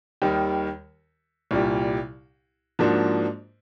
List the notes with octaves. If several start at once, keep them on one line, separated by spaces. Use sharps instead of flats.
D#2 D#3 G3
C2 A#2 G3
G#2 F3 A#3 D4 F#4